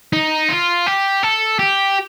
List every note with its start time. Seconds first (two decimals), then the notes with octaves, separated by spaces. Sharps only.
0.13 D#4
0.49 F4
0.87 G4
1.23 A4
1.59 G4